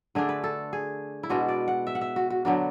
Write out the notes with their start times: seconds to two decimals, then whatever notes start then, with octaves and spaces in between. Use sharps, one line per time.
0.15 D3 A3 D4 G#4
0.29 B4
0.44 A4
0.73 G#4
1.23 E4
1.29 B2 G#3 D4 F#4
1.48 D5
1.68 F#5
1.87 E5
1.95 F#5
2.01 E5
2.16 F#4
2.30 F#4
2.45 D3 F#3 B3 D4 F#4